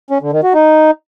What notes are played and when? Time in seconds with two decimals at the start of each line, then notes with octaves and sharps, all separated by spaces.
0.10 C#4
0.21 D3
0.32 D#3
0.43 F#4
0.54 D#4